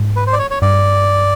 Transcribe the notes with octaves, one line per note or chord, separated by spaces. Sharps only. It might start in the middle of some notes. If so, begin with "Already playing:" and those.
Already playing: G#2
B4
C5
D5
C#5
C#5
G2 D5